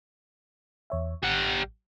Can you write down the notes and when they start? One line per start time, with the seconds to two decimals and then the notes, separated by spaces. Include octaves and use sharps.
0.90 E2 C#5 E5
1.23 A1 G3 F#5